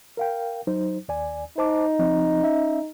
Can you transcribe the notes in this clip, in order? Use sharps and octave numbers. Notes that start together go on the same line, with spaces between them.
A#4 F5 G5
F#3 D#4 C5
D#2 D5 G#5
D#4 C5 A5 D6
F3 C4 D#5
C#4 E5